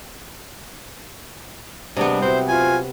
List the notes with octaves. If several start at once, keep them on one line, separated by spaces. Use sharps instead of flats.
C3 G3 G#3 B3 D4
F#3 C4 E4 C5
F4 G#5